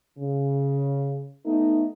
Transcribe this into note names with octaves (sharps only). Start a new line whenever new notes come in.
C#3
A3 B3 D#4